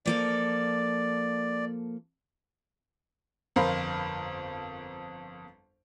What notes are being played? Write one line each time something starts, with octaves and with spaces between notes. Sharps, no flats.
F3 A#3 A4 D5
G1 F2 A#4 C5 F5 B5